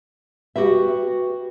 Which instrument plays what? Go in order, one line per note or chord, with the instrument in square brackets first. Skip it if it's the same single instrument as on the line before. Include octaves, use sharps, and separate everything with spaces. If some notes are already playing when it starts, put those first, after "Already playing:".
[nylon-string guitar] F#4 G4 B4 E5